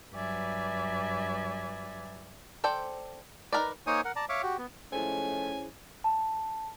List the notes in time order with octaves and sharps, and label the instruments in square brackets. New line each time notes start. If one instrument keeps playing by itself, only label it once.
[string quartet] G2 F#3 B4 D5 E5 G#5
[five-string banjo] A4 C5 D5 G5
D#4 E4 A#4 B4 D5
[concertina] A#3 D#4 C5 C#5 G#5 D#6
A#4 F#5
D5 A5 A#5
C#5 E5 F5 D6
F#4 G4
B3
[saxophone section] F3 G#3 A3 [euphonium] C#4 [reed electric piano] E4 G#4 C5 [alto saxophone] G#5
[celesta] A5